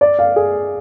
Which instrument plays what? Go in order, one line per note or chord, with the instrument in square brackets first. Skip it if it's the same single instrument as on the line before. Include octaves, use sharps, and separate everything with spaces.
[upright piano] D5
F5
G#4